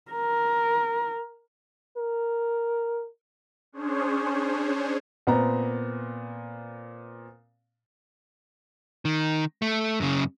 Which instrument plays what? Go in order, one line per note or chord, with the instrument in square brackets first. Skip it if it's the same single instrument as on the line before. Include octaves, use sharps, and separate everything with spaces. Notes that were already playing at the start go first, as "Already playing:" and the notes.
[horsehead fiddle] A#4
[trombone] A#4
[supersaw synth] C#4 D4 G#4 C5 C#5
[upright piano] A#2 B3 C4 A#5
[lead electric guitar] D#3
A3
F#2 C#3